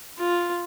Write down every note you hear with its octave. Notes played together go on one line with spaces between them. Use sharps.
F4